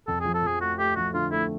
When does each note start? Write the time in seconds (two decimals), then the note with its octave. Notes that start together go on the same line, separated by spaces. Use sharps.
0.07 F2 A4
0.21 F3 G#4
0.35 A4
0.43 F3 G#4
0.61 A3 F#4
0.79 A3 G4
0.96 F3 F#4
1.14 D3 F4
1.32 A3 E4